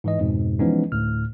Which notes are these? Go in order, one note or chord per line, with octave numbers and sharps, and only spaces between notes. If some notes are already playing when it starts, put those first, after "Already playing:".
G#2 E3 D#5
F2 G#2 B2
E3 F3 G#3 B3 C#4 D#4
D2 A2 F6